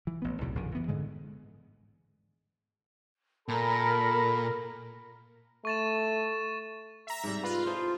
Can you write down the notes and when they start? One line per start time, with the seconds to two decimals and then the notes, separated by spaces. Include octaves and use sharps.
0.07 E3
0.22 A1 B3
0.41 B1 E2 A2 C3
0.55 A#1 F#2 D3 D#3
0.75 D2 E3 B3
0.88 G#2 D3 G#3
3.48 A#2 A4 A#4 B5
5.65 A3 C#6 A6 E7
7.07 E5 A#5
7.24 G#2 C3 G3
7.43 F4 B4
7.66 E4 A4 C5 D#5